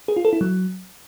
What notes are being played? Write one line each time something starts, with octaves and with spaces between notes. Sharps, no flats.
G#4
F4
A4
E4
F#3